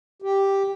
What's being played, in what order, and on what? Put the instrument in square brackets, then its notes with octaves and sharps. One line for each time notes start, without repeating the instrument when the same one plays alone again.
[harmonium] G4